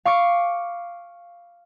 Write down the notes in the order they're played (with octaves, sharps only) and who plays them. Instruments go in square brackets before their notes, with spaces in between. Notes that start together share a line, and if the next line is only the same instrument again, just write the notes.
[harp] F5 C#6 D6 C#7